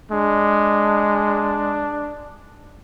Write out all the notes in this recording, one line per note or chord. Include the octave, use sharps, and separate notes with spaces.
G#3 D4